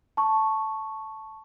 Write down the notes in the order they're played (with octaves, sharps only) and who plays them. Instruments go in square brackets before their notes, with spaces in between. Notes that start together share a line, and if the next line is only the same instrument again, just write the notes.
[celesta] A5 C#6